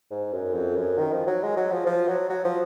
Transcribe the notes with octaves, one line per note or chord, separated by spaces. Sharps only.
G#2
F#2
F2
F#2
D#3
F3
F#3
G#3
F#3
F3
F3
F#3
F#3
F3